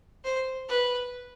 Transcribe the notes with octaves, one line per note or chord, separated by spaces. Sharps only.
C5
B4